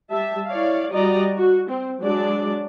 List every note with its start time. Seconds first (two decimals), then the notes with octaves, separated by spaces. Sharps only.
0.11 G3 E5 A5
0.47 E4 C#5 D5 F5
0.90 G3 F#4 D5 D#5 A#5
1.37 F#4
1.69 C4
2.01 F#3 G#3 D4 D5